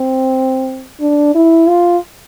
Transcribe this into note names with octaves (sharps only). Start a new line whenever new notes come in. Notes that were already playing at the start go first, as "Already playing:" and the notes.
Already playing: C4
D4
E4
F4